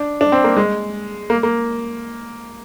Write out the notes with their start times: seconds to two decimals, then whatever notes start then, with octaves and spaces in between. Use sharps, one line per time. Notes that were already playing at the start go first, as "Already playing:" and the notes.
Already playing: D4
0.21 D4
0.32 C4
0.44 A#3
0.57 G#3
1.30 A#3
1.43 A#3